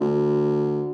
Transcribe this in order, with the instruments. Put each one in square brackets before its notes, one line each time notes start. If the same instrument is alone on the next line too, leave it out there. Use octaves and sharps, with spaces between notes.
[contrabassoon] D2